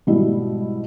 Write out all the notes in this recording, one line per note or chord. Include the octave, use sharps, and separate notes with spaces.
G#2 B2 G3 E4